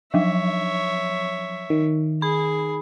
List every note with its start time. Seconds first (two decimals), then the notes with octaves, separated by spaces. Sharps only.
0.14 F3 F#3 C#5 E5
1.70 D#3
2.22 G#4 B5